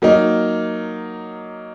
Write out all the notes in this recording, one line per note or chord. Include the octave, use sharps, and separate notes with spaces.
F#3 A#3 D#4